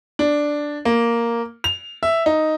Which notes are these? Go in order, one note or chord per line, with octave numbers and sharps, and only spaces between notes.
D4
A#3
F7
E5
D#4